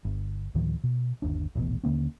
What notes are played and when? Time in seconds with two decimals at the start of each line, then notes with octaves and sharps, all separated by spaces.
0.05 G1
0.55 D2 A2 D#3 F3
0.84 B2
1.22 G1 D#2 D4
1.55 D#1 A1 B2
1.84 D#2 D3 A#3 C#4